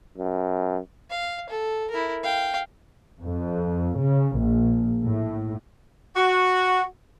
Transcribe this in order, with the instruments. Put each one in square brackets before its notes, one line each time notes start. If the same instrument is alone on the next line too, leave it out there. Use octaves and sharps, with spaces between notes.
[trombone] F#2
[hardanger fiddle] F5
A4
E4 A#4
F5 G5
[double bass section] F2
C#3
A#1
A2
[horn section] F#4